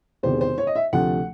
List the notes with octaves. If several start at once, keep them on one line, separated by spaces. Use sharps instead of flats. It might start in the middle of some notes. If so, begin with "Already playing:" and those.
E1 E2 C3 D#3 C5
C5
C#5
D#5
E5
D2 C3 F3 A3 F#5